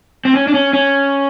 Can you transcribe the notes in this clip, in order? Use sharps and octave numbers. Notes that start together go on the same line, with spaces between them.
C4
C#4
D4
C#4
C#4